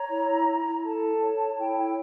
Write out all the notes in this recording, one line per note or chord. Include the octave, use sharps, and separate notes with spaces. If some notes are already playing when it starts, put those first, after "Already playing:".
Already playing: C#5 A#5
E4
E4
A4 A5
C#5
E4 G5
G5